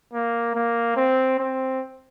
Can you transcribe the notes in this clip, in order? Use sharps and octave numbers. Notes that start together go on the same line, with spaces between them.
A#3
A#3
C4
C4